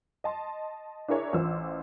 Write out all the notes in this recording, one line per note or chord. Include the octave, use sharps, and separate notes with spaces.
D#5 A5 C6
D4 E4 G#4 A#4 C#5 E5
A1 E3 F4 C5 E6